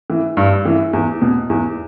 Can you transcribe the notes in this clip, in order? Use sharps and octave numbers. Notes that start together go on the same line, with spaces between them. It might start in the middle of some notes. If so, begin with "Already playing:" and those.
E3
G2
E3
E2
B2
E2